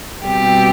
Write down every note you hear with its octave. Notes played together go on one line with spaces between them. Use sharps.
B2 G3 C4 G4